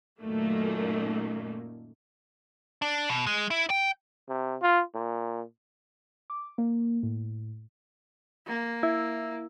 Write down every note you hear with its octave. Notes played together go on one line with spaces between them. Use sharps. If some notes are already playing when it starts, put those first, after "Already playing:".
F#2 A#2 D#3 A3 A#3
D4
B2
G#3
E4
G5
C3
F4
A#2
D6
A#3
A2
A#3
E4